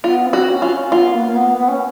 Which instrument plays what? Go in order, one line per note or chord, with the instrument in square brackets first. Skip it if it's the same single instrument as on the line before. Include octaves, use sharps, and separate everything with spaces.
[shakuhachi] B3 [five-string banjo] F4
[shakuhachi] C4
[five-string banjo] F#4
[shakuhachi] C#4
[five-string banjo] F4
[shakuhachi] C#4
[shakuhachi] B3 [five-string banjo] F4
[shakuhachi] A#3
A#3
B3
B3
C#4